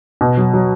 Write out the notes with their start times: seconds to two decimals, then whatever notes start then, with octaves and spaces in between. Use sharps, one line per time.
0.21 B2
0.37 F#3
0.53 F#3